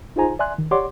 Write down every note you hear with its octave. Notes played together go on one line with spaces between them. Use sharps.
D#4 F4 G#4 C5 G#5 A#5
D5 E5 G#5 C6 F#6
D#3
G4 C#5 D5 F#5 C6 D6